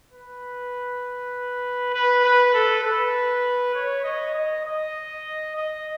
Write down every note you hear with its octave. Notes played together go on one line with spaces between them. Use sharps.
B4
B4
B4
A4
B4
C#5
D#5
D#5
D#5
D#5